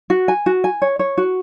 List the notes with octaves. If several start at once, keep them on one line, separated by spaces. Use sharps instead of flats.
F#4
G#5
F#4
G#5
C#5
C#5
F#4